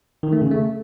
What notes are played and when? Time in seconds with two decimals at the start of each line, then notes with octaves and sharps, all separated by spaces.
0.23 D#3
0.33 A3
0.42 C#3
0.51 A3